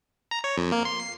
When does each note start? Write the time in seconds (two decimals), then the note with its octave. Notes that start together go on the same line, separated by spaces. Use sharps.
0.31 A#5
0.44 C#5
0.58 F2
0.72 A#3
0.85 C6
1.00 C7